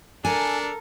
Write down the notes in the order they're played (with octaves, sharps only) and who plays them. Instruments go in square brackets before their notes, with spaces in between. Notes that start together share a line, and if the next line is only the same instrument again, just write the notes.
[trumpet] D4 [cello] A4 A#4 [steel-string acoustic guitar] G#5